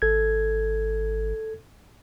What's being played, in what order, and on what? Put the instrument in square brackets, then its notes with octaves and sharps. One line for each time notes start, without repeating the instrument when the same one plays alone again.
[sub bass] G#1 [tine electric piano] A4 G#6